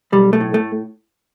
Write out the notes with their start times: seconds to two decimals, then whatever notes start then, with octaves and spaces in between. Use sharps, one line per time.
0.12 B1 G3
0.33 A3
0.40 A2
0.54 A3